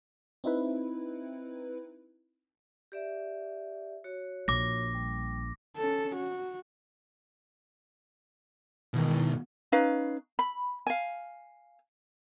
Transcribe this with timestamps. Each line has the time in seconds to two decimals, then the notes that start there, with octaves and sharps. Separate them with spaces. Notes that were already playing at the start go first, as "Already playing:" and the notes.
0.44 C4 D#4 E4 B4
2.92 G4 D5 E5
4.04 F#4 C#5
4.48 A#1 D6 A#6
4.95 G3
5.77 C#4 A4
6.16 F#4
8.94 B2 D#3 E3 G#3
9.72 C#4 D#4 B4 F5
10.39 B5
10.87 F5 G#5